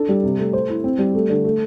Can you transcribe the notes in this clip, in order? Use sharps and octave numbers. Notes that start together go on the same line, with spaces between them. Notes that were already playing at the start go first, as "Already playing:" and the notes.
Already playing: D4 A4
G3
C3
A3
C5
E4
C4
G3
A3
D3
A3